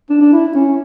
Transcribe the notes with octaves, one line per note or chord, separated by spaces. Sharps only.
D4
D4
E4
C#4